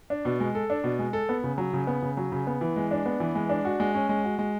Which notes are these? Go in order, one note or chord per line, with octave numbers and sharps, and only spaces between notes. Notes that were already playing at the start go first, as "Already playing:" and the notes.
D4
B2
G#3
A4
D4
B2
G#3
A4
B3
C#3
F#3
C#3
B3
C#3
F#3
C#3
B3
E3
G#3
D4
B3
E3
G#3
D4
F#4
G#3
C#4
G#3
F#4
G#3